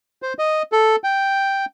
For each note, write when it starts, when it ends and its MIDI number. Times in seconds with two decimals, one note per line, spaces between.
0.22 0.33 72
0.39 0.63 75
0.72 0.96 69
1.04 1.65 79